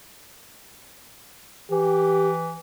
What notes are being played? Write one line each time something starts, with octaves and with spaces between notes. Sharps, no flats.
E3 G4